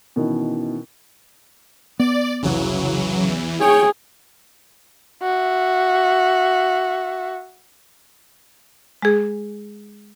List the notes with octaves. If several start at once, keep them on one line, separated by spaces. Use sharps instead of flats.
B2 D#3 E3 C#4
B3 D5
F1 C2 C#3 E3 F#3
E2 E3
G#4 C#5 G5
F#4 E5
G#3 G#4